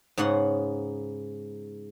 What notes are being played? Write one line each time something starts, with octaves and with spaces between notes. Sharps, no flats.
G#2 C#3 B3 C#5 F#5 C6